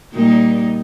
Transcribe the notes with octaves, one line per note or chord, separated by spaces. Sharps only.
A#2 G3 D#4